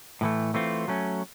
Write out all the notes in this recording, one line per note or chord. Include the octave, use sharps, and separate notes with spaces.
A2 E3 A3
E3 A3 C4 F4
F#3 A3 C#4